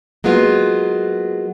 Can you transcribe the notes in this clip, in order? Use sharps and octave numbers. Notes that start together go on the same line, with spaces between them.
F#3 G#3 A#3 B3 F4